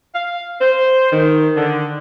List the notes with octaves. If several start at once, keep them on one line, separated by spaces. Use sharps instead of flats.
F5
C5
D#3
D3